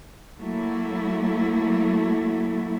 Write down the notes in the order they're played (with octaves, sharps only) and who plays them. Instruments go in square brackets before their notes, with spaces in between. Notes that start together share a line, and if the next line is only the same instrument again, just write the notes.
[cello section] F#3 A3 A#3 E4